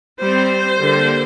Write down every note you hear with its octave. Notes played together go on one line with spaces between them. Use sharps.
G3 C4 C5
D3 G3 A#3